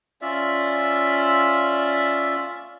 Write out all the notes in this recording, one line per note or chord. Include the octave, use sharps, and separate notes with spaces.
C#4 F4 D5 E5